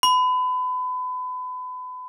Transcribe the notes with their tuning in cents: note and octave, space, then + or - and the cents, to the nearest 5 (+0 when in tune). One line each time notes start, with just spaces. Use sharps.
B5 +30